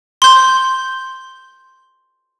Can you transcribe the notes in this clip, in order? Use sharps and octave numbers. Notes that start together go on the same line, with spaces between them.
C6 G6